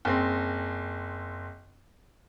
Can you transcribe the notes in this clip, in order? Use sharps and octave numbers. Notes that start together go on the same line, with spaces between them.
F#1 C4